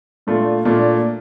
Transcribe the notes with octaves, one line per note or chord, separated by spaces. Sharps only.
A#2 A3 D4 F4
A#2 A3 D4 F4